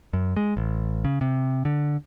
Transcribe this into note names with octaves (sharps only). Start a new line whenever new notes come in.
F#2
G#3
A1
C#3
C3
D3